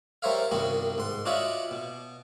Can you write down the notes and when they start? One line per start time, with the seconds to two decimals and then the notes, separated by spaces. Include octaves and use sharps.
0.22 G3 A#4 C5 C#5 E5 F5
0.51 C2 G2 D#3 B3 F#4
0.98 G#2 C6
1.26 D4 F4 F#4 C#5 D#5 E5
1.71 B2